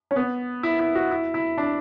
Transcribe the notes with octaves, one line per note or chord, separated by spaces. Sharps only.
C#4
B3
E4
E4
F#4
E4
E4
D4